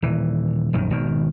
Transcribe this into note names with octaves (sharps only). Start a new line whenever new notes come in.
D#1 E3
E1 A#1 F#2 D#3
G#1 B2 D#3